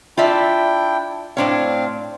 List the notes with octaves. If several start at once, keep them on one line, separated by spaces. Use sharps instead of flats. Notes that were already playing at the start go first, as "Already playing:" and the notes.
D4 E4 F4 D5 E5 G5
A2 C4 D4 C#5 F5